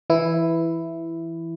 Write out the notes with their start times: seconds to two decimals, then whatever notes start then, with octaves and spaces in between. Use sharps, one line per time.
0.10 E3 E4